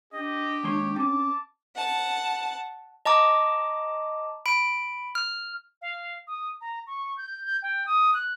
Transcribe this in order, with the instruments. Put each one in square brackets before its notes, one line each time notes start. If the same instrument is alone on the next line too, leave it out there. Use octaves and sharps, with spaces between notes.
[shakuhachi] D4 [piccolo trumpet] G4 [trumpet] D#5
[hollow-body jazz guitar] D#2 G#3 C6 [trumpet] C#5
[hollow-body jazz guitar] C4 C#4 [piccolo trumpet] A5 [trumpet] D6
[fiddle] F#5 A5
[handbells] D#5 A5 A#5 D6
B5 D7
F6
[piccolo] F5
D#6
A#5
C#6
G6
G6
G5
D#6
F#6